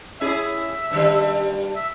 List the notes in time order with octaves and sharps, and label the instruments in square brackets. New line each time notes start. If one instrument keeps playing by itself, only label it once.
[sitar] C#4 E4 G#4 [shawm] E5
[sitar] G2 D#3 G3
[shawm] E5